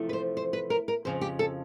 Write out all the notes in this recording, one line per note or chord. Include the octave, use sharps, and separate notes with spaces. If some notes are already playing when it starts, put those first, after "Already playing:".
Already playing: E2 C3 F3 A3
B4
C5
C5
B4
A#4
A#4
F2 C#3 F3 C5
G4
A4